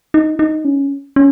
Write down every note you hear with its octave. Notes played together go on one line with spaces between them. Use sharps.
D#4
D#4
C#4
C#4